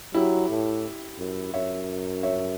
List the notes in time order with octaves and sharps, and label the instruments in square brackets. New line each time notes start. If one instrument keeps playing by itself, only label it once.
[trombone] F#3 [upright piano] E4 G4
[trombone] A2
F#2
[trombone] F#2 [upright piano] C#5 E5
[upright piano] C#5 E5